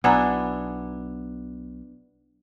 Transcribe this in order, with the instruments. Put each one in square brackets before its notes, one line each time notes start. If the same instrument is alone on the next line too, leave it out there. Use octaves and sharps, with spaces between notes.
[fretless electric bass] B1 B2 [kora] B3 D4 E4 [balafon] F#5 G#5 A#5